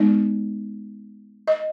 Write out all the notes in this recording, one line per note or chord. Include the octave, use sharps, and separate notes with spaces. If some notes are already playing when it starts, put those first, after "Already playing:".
Already playing: G#3 B3 D#4 D5
D#5